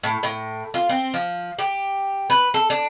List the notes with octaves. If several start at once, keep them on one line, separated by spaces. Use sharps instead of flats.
A2
A2
F4
C4
F3
G4
B4
A4
D4